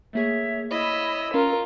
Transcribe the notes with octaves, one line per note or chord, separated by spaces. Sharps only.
A3 A#3 G#4 C#5 E5
E4 C#5 D#5 F5 B5 E6 D#7
C#4 F4 A#4